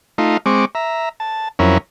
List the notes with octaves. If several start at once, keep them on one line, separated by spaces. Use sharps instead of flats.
A3 D#4 F4
G#3 C4 C#6 D6
E5 A#5
A5
F2 F#3 C#4 E4 A#4